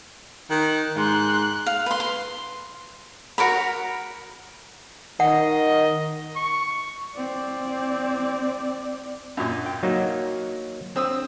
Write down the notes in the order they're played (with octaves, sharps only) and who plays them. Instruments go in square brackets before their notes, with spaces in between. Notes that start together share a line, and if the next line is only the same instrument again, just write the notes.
[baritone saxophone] D#3 [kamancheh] F#6
[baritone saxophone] G#2 [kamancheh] C6 F#6
[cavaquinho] F5
B4 C6
C6
F#4 A#4 C#5 B5
[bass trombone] D#3 [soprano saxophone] D#5 [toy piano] F#5
[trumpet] C#6
[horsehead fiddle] C4 D5
[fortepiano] F#2 A#2
[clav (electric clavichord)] G5
F#3 A#3 D#4
[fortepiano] C4 D#6 E6